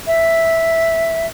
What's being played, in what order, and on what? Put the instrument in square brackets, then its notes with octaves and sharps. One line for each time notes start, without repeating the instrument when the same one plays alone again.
[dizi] E5